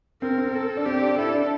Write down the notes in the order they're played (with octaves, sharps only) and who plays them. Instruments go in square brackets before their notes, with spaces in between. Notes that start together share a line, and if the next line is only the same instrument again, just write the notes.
[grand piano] C4 [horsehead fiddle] A#4
[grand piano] C4
[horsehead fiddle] A4
[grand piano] D4
[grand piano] C4 [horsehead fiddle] G4
[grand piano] D4
[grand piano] E4 [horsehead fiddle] A4
[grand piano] D4